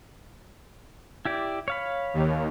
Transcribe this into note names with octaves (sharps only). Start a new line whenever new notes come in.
E4 G4 D5
C#5 F5 B5
D#2